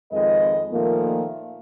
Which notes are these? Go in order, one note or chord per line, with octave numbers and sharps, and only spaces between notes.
F2 D#3 G#3 B4 D#5
A#2 D#3 F3 A3 A#3